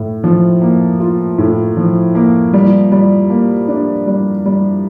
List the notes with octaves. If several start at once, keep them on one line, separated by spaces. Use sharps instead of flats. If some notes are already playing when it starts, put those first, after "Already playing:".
Already playing: A2
F3
A#3
F4
A2
F3
A#3
G3
G3
A#3
D4
G3
G3